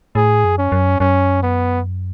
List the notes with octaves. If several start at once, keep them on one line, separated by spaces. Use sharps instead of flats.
A2 G#4
F#2
C#4
F#2
F#2 C#4
B3